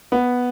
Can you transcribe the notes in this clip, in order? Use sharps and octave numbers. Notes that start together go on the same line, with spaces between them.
B3